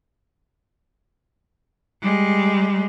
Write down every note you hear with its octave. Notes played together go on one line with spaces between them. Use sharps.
G3 G#3